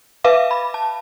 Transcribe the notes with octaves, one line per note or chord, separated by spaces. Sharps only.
B4 E5 F5 D6
B5
A5